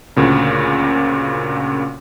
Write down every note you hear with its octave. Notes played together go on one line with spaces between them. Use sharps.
D2 A#2 C#3